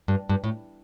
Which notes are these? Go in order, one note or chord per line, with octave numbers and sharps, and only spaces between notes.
G2
G2
A2